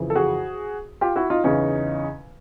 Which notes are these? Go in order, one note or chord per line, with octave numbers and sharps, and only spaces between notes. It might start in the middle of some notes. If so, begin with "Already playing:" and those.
Already playing: F2 C#3 E3
A4
F#4 G#4
F4 G4
E4 F#4
D#4 F4
E2 C#3 E3 C#4 D#4